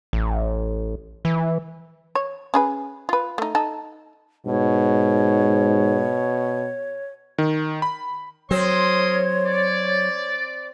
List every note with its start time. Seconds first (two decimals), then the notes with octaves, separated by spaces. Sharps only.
0.13 A1
1.25 E3
2.15 C#5
2.54 C#4 G#4 B4
3.09 F4 B4
3.38 A3 D#4
3.55 D#4 A4
4.46 G#2 B2 C#5
7.38 D#3
7.82 B5
8.51 F#3 C4 A#4 C#5 C6 D#6
9.46 D5